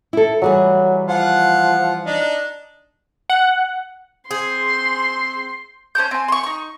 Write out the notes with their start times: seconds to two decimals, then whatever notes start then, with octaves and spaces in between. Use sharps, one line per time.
0.13 E4 A4
0.42 E3 F#3 G3 G#4
1.08 F3 F4 F#5
2.06 D4 D#4
3.30 F#5
4.31 C4 G#4 C5 C6
5.95 C#4 C5 A5 G6
6.11 C4 G#5
6.28 C6 C#6
6.44 D#4 C#6